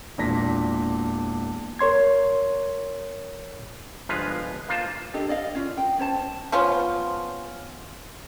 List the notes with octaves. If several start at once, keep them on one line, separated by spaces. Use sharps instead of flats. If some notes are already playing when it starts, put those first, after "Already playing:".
E1 A#2 D4 D5 A#6 B6
A#4 C#5 C6 G#6
G1 F3 G#3 B4 F5
A#3 F4 C5 A5
D4 G4 A4 D#5
D5 D#5 F5
C#4 F4
G5
C#4 C5 A5
F3 B3 C#4 F4